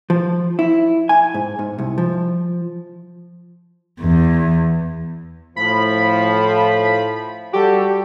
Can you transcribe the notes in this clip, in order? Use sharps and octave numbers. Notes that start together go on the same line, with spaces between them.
F3
E4
G#5
G#2
G#2
C2
F3
E2
A2 F3 B5
G3 F#4 G4 A4